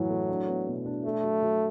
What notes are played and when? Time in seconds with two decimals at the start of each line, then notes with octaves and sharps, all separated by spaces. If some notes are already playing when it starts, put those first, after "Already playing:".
Already playing: F#2 A2 E3 F#3 E4
0.10 A3
0.29 D4
0.47 B3
0.67 B2
0.86 D4
1.05 A3 A4
1.24 F#3
1.42 F#3